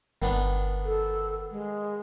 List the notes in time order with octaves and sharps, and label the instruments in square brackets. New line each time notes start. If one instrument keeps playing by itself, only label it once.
[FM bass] G1 [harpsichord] D#3 B3 D4
[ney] A4
G#3